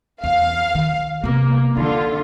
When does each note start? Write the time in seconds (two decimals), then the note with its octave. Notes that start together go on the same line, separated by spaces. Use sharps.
0.24 E2 F5
0.75 D#3
1.24 C3 A#3 B3
1.77 D3 D#4 F4